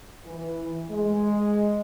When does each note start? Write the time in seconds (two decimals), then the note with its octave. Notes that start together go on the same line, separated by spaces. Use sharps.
0.24 E3
0.90 G#3